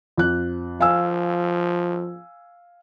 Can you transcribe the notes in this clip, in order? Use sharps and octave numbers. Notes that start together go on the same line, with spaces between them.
F2 F#6
F3 F5 G#5 E6